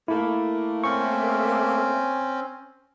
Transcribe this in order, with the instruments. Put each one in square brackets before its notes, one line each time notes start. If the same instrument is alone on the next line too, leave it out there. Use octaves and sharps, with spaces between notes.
[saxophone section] A3 A#3 [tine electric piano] E4
[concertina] C4 C#4 [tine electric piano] C#6